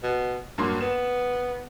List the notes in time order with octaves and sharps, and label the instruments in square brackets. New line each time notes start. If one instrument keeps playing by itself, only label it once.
[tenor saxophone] B2
[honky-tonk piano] G2 A#3 C6 [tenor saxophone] F#3
[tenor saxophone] B3 [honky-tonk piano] E7